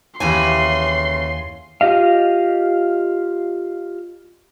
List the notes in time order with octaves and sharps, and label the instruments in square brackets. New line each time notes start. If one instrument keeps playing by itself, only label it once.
[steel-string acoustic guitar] D#2 G#5 [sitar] C#3 E3 [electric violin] C6
[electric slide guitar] F4 G4 D#5 F5